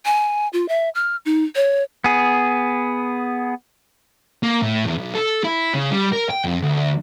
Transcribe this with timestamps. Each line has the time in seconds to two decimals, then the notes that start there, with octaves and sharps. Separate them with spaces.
0.05 G#5
0.53 F4
0.69 E5
0.95 F6
1.25 D#4
1.56 C#5
2.04 B3 G#4
4.43 A#3
4.62 A2
4.85 E2
4.98 B1
5.15 A4
5.44 E4
5.74 C#3
5.92 G3
6.13 A#4
6.31 G5
6.45 F2
6.63 D2